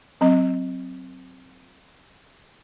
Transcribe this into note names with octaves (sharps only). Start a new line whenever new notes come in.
F#3 C4 D#5